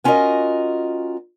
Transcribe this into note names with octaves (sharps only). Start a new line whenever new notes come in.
B3 C#4 F4 F#4 A#4 D#5